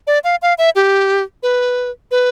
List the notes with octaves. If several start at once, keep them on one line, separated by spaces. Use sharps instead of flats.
D5
F5
F5
E5
G4
B4
B4